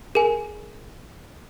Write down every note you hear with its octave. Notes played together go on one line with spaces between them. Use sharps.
G#4 A#4 G#5